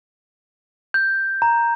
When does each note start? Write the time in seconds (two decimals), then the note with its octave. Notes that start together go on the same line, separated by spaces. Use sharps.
0.94 G6
1.42 A#5